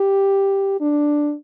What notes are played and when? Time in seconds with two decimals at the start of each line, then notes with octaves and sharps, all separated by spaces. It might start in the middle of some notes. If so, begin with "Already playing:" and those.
Already playing: G4
0.81 D4